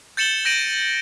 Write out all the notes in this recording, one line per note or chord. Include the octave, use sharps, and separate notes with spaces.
G6 A6 C#7 E7 F#7 G7
G6 A#6 D7 D#7 F#7